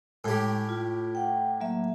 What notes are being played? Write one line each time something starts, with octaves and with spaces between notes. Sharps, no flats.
A2 G#3 G4
F4
F#5 G5
F#3 A#3 E5